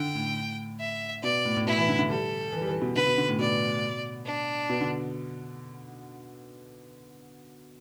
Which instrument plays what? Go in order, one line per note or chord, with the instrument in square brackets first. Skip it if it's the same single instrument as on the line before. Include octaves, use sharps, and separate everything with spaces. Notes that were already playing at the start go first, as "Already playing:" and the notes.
Already playing: [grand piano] D3 [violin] G5
[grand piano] A2
[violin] E5
[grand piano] B2 [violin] D5
[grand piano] A2
A2
[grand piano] B2 [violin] E4
[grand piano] E3
D3
D3
[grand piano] G3 [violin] A4
[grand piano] E3
G3
E3
B2
[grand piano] D3 [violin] B4
[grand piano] B2
D3
A2
[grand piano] B2 [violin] D5
[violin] D4
[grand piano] B2
D3